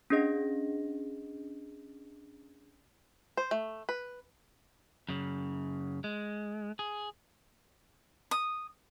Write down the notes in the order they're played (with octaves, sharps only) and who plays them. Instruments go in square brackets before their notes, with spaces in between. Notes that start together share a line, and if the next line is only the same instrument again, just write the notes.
[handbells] C#4 D4 G#4 D#5 A#6
[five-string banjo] C5
A3
B4
[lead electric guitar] F#2 C#3
G#3
G#4
[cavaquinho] D#6